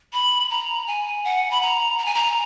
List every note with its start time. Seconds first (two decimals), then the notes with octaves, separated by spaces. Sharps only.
0.13 B5
0.50 A#5
0.87 G#5
1.25 F#5
1.51 B5
1.62 A#5
1.98 A#5
2.06 G#5
2.15 A#5